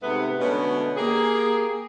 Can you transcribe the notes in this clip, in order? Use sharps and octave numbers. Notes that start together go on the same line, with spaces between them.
G#2 C3 A3 B3
B2 D3 G#3 A3 B3 C#4
A#3 G4 G#4